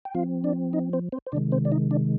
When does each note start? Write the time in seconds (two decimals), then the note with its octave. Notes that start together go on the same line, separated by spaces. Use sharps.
0.05 G5
0.15 F3 C4 F4 F5
0.44 D4 D5
0.73 D#4 D#5
0.93 C4 C5
1.12 C4 C5
1.27 C5
1.32 C3 D#3 G#3 D4 D5
1.52 C4 C5
1.65 D5
1.72 D#4 D#5
1.91 D4 D5